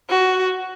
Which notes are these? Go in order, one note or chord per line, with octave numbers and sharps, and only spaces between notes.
F#4